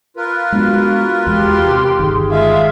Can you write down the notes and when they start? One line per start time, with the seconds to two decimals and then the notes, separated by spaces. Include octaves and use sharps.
0.17 F4 A#4 B4
0.52 G#3 B3 D4 F#4
1.27 E2 G#3 G4 C6
1.66 C3
1.99 G1 D#3 G#4
2.31 G#3 F4 E5 F5